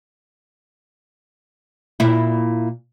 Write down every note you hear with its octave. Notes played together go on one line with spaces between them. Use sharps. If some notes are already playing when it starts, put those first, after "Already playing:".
A#2 E4